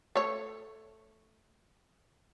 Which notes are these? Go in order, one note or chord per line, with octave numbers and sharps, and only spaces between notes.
A3 C#5